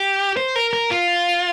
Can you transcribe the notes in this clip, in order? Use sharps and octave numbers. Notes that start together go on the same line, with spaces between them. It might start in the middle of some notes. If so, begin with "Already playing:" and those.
Already playing: G4
C5
A#4
A#4
F4